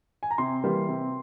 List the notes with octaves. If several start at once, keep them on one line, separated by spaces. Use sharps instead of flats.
G#5
A#5
C3 C6
E3 G3 A#3
C3